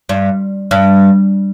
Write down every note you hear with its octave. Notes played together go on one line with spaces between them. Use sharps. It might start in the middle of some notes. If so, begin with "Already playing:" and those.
G2
G2